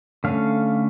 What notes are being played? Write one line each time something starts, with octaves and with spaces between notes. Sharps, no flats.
D3 A3 C#4 F5